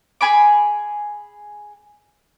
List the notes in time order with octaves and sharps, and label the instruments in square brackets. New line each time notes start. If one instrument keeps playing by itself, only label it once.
[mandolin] G#4 G#5 B5 D6